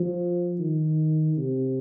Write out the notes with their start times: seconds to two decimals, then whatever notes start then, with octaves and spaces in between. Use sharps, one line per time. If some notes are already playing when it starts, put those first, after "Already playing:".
Already playing: F3
0.59 D#3
1.37 C3